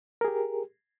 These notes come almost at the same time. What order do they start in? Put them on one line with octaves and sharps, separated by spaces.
A#4 G#4 G4